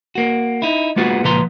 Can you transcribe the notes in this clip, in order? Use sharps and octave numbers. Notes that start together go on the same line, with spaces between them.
A#3 F#4
D#4 E4
G#3 A#3 B3 F4 F#4 G#4
C#2 A#2 F3 B4 A#5 C6